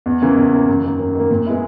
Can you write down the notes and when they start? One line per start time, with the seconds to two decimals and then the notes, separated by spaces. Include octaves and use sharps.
0.06 E2
0.22 C#3 E3 A#3
0.37 E2
0.52 C#3 E3 A#3
0.68 F#2
0.83 D#3 A#3
1.00 F#2
1.15 D#3 A#3
1.31 A#2
1.46 G#3 B3 E4